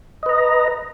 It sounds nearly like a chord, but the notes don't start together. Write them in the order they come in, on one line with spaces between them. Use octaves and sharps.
D#5 B4 A#5